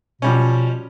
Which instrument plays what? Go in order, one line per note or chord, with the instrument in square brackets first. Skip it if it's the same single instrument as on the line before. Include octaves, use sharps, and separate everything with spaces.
[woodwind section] B2 [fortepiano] F3 G3 C#4